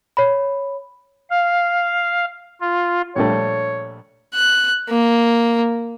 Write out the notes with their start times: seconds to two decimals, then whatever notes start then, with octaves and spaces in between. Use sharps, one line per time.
0.17 C#5 B5
1.30 F5
2.61 F4
3.16 A#1 G3 A3 C#5
4.35 F#6
4.89 A#3